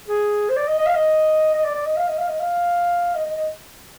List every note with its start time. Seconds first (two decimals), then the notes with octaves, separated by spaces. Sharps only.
0.08 G#4
0.49 C5
0.56 D5
0.68 D#5
0.78 D#5
0.86 F5
0.94 D#5
1.54 D#5
1.64 D5
1.75 D5
1.86 D#5
1.96 F5
2.07 D#5
2.18 F5
2.28 D#5
2.40 F5
3.15 D#5
3.25 D#5
3.36 D#5